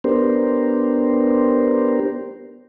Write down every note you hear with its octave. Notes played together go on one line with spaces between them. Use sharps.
B3 D4 G4 A#4 C5